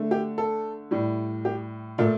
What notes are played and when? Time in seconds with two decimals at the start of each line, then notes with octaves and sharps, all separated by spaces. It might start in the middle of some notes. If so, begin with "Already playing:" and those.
Already playing: D3 A3
0.11 G4
0.38 A4
0.91 A2 G3
1.45 G4
1.98 A#2 A3 F4